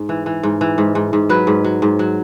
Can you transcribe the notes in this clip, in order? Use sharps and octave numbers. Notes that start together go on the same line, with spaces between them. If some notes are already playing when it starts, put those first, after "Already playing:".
Already playing: G#2
E3
E3
G#2
E3
G#2
G#2
G#2
F#3 B4
G#2
F#3
G#2
F#3